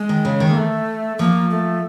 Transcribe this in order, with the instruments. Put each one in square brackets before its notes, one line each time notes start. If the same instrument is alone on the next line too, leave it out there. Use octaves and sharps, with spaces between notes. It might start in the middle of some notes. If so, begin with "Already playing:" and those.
Already playing: [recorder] G#3
[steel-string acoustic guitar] D#3
C#3
D#3
[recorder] A#3
A3
[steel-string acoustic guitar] F3 [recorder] A#3
[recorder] A3